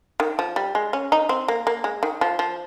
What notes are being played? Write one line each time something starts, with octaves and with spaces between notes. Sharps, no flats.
D#3
F3
G3
G#3
C#4
D#4
C4
A#3
A#3
G#3
D#3
F3
F3